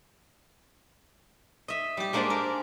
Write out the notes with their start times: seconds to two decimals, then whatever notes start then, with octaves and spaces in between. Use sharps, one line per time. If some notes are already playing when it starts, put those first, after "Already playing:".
1.68 D#5 E5
1.97 G3 G4
2.13 G#3 A#3 D4 G4 C5 D5
2.30 A#4